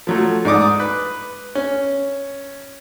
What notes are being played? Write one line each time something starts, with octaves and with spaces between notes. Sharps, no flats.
F3 F#3 A3
G#2 D5 D6 D#6
B4
C#4